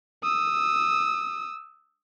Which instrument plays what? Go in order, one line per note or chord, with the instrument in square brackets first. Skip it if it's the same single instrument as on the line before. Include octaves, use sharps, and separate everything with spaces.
[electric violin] D#6 E6